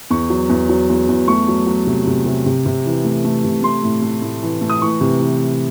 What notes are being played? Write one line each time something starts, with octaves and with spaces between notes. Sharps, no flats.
E2 C#6
F#3
E2
F#3
E2
E2
A3 C#6
F#3
F#3
C3
C3
C3
C3
C3
E3
A3
A3
C3
A3 C6
A2
A3
A2
E3
A3
D#6
E3 C#6
C3
E3